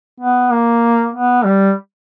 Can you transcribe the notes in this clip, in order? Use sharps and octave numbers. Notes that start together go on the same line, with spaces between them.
B3
A#3
B3
G3